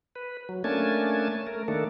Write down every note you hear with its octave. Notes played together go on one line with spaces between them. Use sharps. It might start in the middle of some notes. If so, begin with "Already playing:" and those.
B4
F#3
A3 A#3 C#4 D4 G#5 A5
A3 A#4
D#3 A3 A#3 D4 A4